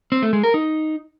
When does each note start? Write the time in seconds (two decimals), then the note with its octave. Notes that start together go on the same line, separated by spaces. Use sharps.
0.12 C4
0.22 A3
0.33 G#3
0.43 A#4
0.54 D#4